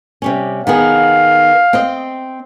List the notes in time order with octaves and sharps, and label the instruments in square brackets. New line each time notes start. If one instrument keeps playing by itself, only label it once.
[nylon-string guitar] C3 G3 C#4
[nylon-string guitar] D#3 B3 G#4 [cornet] F5
[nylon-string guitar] C4 D#5